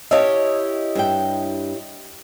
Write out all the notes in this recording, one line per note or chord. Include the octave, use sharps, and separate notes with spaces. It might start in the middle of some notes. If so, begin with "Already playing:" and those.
E4 G4 C#5 D#5 F5 A5
G2 E5 G5